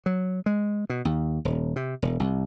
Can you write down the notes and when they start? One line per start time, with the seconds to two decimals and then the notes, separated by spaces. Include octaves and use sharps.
0.06 F#3
0.46 G#3
0.90 B2
1.05 D#2
1.45 D#1
1.76 C3
2.02 E1
2.20 C2